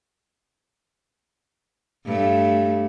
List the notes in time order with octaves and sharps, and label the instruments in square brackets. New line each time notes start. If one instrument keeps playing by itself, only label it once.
[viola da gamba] G2 A3